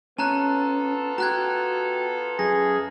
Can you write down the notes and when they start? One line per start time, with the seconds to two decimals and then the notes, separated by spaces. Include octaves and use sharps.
0.18 B3 C#4 F4 A4 A5 A#5 F#6
1.18 F#4 G4 A#5 F#6 G#6
2.39 F#2 G#4 A#6